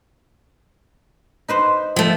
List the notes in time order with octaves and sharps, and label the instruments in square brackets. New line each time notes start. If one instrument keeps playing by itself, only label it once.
[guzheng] D#4 B4 C5
[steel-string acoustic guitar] F3 A3